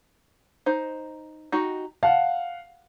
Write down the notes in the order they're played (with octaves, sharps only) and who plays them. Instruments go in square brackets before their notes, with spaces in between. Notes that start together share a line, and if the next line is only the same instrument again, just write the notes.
[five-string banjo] D#4 C5
D#4 F#4 G4
[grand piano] F5 F#5 [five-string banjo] A5